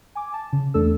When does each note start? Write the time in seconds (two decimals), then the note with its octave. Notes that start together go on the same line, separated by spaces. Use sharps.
0.15 G#5 D6
0.34 A5
0.53 C#3
0.74 E2 A3 D4 A4 E6